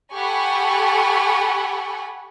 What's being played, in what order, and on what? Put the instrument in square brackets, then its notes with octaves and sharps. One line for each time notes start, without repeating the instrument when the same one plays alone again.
[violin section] G4 A4 F#5 G#5 B5 C#6